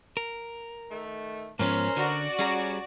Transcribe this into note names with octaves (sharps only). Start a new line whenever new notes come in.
A#4
D#3 A3
G#2 F3 B3 C#4 A#4 C5
D3 F#4 D5
G3 C#4 G#4 A#5